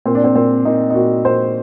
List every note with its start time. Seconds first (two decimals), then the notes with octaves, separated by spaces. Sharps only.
0.06 A#2 C4
0.15 D4
0.24 C4
0.35 A#2 C4
0.65 A#2 D#4
0.90 D#4
0.95 A#2 F#4
1.25 A#2 C5